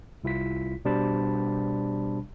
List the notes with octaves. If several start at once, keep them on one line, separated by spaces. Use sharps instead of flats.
C2 E4 F4 B6
B2 G3 D4 C5 A5 B5